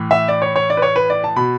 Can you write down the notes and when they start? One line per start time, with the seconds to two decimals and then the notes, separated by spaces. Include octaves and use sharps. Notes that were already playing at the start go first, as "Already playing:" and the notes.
Already playing: A2 E3
0.11 E5
0.28 D5
0.42 C#5
0.56 C#5
0.70 D5
0.77 B4
0.82 C#5
0.96 B4
1.10 D5
1.24 A5
1.36 B2 B5